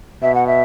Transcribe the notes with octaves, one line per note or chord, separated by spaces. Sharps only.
B2 E5
F#5
E5